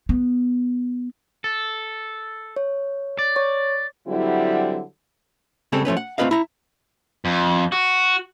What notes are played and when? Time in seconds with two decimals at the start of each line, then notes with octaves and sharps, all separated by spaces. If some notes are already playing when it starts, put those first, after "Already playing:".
0.09 B3
1.44 A4
2.56 C#5
3.19 D5
3.36 C#5 C#6
4.08 D3 F#3 G3 C4 E4
5.72 C#3 G3 G#3 C4 G4 A4
5.85 F3 A3 C#4 B4
5.97 F#5
6.18 A3 C4 F4 B4 D#5 F5
6.31 E4 A#5
7.25 F2
7.72 F#4